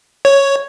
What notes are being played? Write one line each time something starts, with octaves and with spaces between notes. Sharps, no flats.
C#5